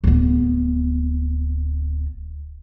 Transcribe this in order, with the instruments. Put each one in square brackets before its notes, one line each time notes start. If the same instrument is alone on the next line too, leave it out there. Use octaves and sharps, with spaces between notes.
[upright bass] D1 B3